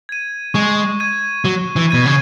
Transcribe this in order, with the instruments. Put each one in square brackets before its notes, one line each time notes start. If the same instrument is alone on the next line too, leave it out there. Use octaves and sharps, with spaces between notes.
[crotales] G#6 D#7
[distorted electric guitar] G#3 [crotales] C#6
[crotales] G#6 D#7
[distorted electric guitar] F#3 [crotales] C#6
[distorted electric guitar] E3
[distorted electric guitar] B2 [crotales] G#6 D#7
[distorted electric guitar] C#3